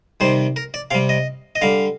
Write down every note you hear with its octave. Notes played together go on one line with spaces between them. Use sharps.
C3 D#3 G3 C5
A#4
D5
C3 G3 F5
D#5
D#5
D3 G3 F5